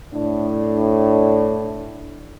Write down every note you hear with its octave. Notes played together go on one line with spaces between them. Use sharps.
A2 D4